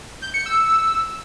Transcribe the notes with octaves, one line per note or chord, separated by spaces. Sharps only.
G6
C#7
E6